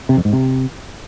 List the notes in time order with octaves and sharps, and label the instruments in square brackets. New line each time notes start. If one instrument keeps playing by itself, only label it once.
[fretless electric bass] C3
F2
G#2
C3